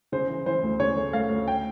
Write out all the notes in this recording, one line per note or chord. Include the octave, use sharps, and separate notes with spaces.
C#3 C5
E3
E3 C5
D2
C#3 C#5
A3
A3 F5
D2
G5